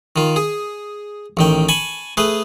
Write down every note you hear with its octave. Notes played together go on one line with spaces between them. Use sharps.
D#3 F4
G#4
A1 D#3 G5
G#5 A5 B5 C#6
A3 G#4 B4